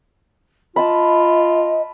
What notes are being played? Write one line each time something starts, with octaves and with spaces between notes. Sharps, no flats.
F4 D#5 A5 B5